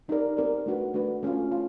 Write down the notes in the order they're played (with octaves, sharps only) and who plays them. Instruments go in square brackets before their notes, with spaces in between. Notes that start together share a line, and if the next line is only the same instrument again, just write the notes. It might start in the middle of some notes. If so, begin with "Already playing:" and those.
[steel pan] C4 D#4 G4 A#4 D5
C4 D#4 G4 A#4 D5
A3 D4 F#4 B4
A3 D4 F#4 B4
A3 C#4 F4
F4